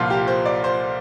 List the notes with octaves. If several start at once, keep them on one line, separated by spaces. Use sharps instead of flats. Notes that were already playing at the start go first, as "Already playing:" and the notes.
Already playing: C2 A#2 F3 F4
G4
C5
D5
C5